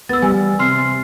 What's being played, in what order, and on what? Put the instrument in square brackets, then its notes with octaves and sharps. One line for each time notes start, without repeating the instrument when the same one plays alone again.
[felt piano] B3 [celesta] E6 A6
[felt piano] G3 [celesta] G#5
[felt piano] C3 [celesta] C6 F6 C7